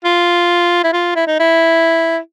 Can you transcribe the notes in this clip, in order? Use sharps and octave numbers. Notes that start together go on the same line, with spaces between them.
F4
E4
F4
E4
D#4
E4